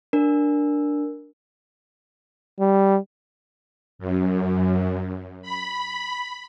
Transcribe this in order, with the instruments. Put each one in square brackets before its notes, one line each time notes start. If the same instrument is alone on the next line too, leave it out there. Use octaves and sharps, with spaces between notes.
[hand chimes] D4 A#4
[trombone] G3
[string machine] F#2
B5